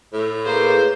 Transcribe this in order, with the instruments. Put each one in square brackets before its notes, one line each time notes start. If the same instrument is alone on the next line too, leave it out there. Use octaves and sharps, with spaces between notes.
[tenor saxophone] A2
[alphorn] A#3 [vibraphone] G#4 B4 [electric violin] C5